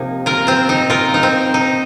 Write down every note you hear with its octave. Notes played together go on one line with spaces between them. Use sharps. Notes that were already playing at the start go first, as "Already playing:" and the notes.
Already playing: C3 F3 A#3 D#4
F4 A#4
C4 F4
D#4
F4 A#4
D#4
C4
D#4